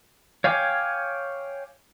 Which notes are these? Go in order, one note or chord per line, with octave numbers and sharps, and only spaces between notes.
C#5 F5 G5 G#5 D6